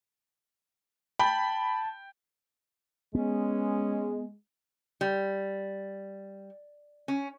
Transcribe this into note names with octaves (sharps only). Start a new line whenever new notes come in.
G5 A5 B5
G#3 B3 C#4
G3
C#4